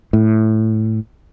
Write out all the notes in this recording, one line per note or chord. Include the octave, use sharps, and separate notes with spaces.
A2